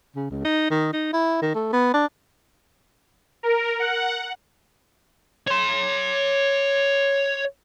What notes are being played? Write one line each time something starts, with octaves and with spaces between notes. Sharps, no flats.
C#3
C#2
D#4
D#3
D#4
E4
D#3
A3
B3
D4
A#4
F#5
C#5 C6